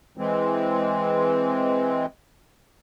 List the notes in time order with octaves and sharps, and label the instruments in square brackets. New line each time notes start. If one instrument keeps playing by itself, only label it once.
[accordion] E3 G#3 C4